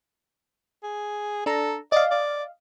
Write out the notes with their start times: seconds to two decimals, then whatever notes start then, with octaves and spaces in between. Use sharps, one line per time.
0.83 G#4
1.46 D4 A4 A#5
1.92 D5 D#5 F5
2.11 D5